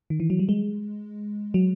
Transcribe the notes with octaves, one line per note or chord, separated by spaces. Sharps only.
D#3
E3
F#3
G3
G#3
F#3